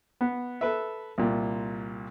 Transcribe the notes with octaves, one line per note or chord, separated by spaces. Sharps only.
B3
A4 B4 E5
C2 A#2